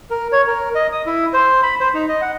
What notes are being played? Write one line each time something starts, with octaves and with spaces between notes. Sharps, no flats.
A#4
C#5
A#4
D#5
D#6
E4
C5
B5
C5
D#4
D#5
F#5